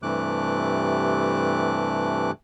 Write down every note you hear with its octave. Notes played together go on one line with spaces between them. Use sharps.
G2 C3 E3 A3 D6 F#6